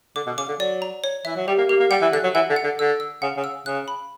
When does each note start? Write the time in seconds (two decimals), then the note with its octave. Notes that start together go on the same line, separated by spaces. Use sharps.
0.16 D3 D6
0.27 B2
0.38 C#3 D6
0.48 D3
0.60 F#3 D5
0.82 A#5
1.04 C#5
1.25 E3 E5
1.36 F#3
1.47 G3 G4
1.58 A#3
1.69 A#3 G4
1.80 A#3
1.91 G3 F#5
2.02 E3
2.12 D3 F#6
2.23 F#3
2.35 E3 F#5
2.50 D3
2.56 F#5
2.64 D3
2.79 D3 E6
3.00 E6
3.22 C#3 F#5
3.37 C#3
3.44 E6
3.66 C#3 F#6
3.88 B5